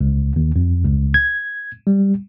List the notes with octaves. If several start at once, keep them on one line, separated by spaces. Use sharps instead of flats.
C#2
D#2
F2
C#2
G#6
G3